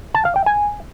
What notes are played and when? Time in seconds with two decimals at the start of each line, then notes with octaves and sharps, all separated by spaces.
0.14 A5
0.25 F5
0.36 G5
0.46 G#5